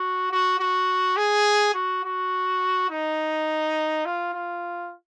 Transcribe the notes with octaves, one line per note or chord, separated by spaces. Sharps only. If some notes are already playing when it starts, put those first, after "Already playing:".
Already playing: F#4
F#4
F#4
G#4
F#4
F#4
D#4
F4
F4